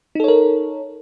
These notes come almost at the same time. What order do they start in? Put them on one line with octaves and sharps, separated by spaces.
D#4 A4 C#5 A#4